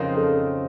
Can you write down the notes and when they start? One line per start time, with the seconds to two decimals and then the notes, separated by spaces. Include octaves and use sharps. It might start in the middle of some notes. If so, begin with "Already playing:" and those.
Already playing: F2 C#3 F3 C4 D#4 A#4
0.17 A4